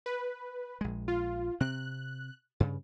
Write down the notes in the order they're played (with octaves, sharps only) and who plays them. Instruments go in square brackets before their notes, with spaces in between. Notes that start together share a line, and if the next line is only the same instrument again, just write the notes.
[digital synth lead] B4
[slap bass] A#1 G#3
[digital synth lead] F4
[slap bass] C3 C4 [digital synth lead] F#6
[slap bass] G2 C#3